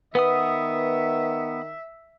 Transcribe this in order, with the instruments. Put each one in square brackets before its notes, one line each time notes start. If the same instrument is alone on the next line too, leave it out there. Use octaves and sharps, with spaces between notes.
[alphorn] D#3 [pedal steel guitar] B3 F#5 D#6 [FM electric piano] B4 [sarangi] E5